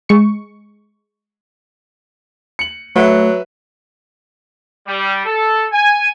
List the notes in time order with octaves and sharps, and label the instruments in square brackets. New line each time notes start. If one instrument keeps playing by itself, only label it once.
[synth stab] G#3 C#6
[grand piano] C#7 F#7
[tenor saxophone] F#3 [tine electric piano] A3 [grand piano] B4 E5
[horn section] G3
A4
G#5